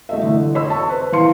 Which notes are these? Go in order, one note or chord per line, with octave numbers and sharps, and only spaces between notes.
A3 D#5 E5
D3 E3
C#5 D#5 B5 C6 E6
A5 C#6
B4 C5
E3 F5 C6 C#7